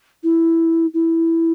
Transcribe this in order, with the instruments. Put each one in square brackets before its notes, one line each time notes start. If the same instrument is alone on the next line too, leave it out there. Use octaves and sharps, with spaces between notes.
[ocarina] E4
E4